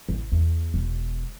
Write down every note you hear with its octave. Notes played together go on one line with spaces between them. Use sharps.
A1
E2
E1